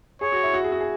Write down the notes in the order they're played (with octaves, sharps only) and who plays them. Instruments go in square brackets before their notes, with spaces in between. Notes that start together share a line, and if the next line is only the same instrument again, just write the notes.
[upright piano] G#4 [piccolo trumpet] C#5
[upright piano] F#4
E4
F#4
G#4
F#4
G#4